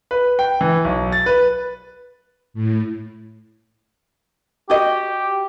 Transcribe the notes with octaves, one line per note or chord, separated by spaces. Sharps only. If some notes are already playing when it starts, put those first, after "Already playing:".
B4
G5
E3
B1
A6
B4
A2
F#4 G4 D#5